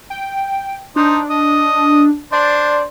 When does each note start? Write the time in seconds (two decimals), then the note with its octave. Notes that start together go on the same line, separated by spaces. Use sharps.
0.10 G5
0.96 D4 D#4 C5
1.30 D#5
2.32 D4 C5 D5